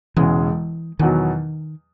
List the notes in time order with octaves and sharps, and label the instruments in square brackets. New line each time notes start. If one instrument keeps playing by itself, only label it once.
[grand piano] E1 E2 C#3 G#3 [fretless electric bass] E3
[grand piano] E2 B2 F#3 [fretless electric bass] D#3